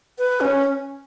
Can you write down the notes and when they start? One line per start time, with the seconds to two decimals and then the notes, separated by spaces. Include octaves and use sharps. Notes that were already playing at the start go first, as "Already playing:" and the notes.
0.18 B4
0.41 C#4